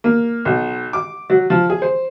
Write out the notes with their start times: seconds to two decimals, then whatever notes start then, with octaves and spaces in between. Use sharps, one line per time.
0.04 A#3
0.45 B1
0.93 D6
1.30 F#3
1.50 F3
1.70 G#4
1.82 C5